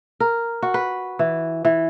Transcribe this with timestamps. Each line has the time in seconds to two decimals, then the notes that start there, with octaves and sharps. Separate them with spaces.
0.20 A#4
0.63 F#4
0.74 B4
1.19 E3
1.65 E3